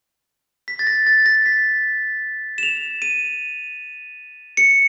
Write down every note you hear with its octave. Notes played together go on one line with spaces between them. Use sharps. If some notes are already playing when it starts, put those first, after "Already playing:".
B6
A6
A#6
A6
A#6
B6
E7
F7
D#7
C#7